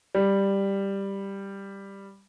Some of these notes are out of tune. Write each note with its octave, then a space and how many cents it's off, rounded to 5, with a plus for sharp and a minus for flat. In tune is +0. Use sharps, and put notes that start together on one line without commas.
G3 +5